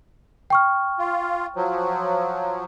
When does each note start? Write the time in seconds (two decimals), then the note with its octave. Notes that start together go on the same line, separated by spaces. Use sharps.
0.50 G5 C#6 F6
0.99 F4
1.56 F3 F#3